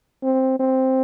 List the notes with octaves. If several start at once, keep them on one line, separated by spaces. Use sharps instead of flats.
C4
C4